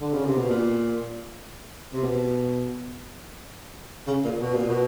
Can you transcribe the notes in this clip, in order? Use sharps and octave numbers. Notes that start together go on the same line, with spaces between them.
D3
C#3
C3
B2
A#2
C3
B2
C#3
A#2
B2
A#2
B2